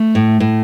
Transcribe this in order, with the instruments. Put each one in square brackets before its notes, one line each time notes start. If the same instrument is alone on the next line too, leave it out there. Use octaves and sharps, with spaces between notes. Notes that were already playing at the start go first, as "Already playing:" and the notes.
Already playing: [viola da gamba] A3
[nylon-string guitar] A2
A2